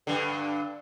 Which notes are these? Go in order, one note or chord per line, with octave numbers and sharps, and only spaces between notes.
G2 D3